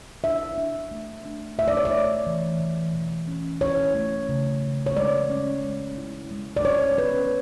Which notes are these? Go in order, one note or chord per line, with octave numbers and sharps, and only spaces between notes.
D4 E5
D4
A3
D4
A3 E5
D5
C#5
D5
A3
E3
E3
B2
C#4
E4 C#5
A3
C#3
C#3
C#5
G#3 D5
C#4
G#3
E4
G#3
D5
D3 C#5
C#4 B4